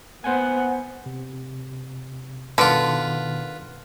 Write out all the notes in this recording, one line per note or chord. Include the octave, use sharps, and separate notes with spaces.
B3 C5 F#5 G#5
C3
B2 D3 D#3 F4 B4